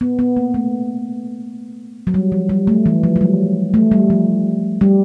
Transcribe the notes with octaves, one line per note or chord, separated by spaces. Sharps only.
B3
B3
A#3
A3
F#3
G3
F3
G3
A3
E3
F3
F#3
G3
A3
G3
F3
G3